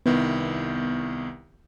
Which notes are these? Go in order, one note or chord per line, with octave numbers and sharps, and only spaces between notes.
C2 D#3 B3 E4